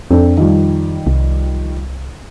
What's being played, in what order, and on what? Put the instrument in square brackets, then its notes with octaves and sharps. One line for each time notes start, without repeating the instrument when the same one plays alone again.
[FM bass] F2 [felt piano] C4 D4 A4
[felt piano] D#3 F3 G3
[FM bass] C2